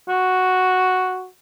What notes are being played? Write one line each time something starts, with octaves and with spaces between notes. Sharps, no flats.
F#4